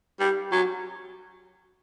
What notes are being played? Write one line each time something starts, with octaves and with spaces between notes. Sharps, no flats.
G3
F#3